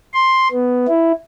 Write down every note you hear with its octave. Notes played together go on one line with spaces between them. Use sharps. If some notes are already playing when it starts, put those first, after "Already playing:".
C6
B3
E4